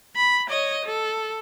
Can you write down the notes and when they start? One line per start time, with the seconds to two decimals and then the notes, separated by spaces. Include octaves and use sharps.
0.16 B5
0.49 C#5 D#5
0.85 A4